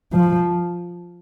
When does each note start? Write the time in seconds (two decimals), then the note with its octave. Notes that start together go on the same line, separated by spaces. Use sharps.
0.13 F3